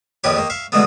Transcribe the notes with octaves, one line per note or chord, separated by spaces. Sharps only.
A#1 F2 D#3 G4 B4 C#5
D#3 A#3
E5 F5 C#6
B2 D3 E3 G#3 A3 B3